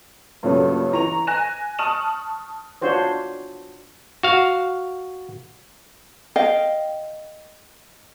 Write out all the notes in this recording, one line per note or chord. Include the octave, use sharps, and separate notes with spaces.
G2 A#2 C#3 F#3 A3 C#4
E3 A#5 C#6 F7
G#5 F#6 A#6 E7
A5 C#6 D#6 F6 E7 F#7
D4 F4 F#4 C5 C#5
F#4 F5
D#5 F5 G5